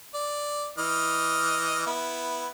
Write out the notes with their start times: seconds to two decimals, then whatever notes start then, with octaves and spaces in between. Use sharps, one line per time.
0.14 D5
0.78 E3 D#5 F6
1.86 B3 E4